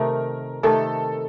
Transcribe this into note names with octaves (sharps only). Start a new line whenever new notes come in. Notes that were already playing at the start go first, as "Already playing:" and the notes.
Already playing: C3 D#3 A3 D#4 A#4
C3 D#3 A3 D#4 A4